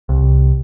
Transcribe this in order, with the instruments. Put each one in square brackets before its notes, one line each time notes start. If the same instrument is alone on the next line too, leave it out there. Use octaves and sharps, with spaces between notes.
[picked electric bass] C2